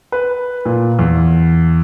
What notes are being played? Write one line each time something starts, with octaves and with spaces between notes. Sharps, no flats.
B4
A#2
E2